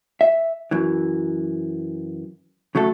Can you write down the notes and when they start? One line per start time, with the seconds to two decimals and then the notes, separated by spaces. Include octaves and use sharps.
0.21 E5
0.71 F#2 E3
2.75 C#3 F#3 A3 A4